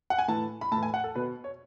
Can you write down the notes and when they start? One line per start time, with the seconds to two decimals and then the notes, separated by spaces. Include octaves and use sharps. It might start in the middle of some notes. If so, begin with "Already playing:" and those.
0.10 F#5
0.18 G#5
0.28 A2 E3 A5
0.61 B5
0.71 A2 A5
0.77 E3
0.83 G#5
0.94 F#5
1.04 A4
1.15 B2 B4
1.44 C#5